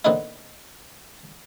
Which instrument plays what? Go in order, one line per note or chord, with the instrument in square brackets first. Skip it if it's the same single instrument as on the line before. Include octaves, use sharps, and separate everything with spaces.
[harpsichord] A#2 D3 B3 C4 D#4 E4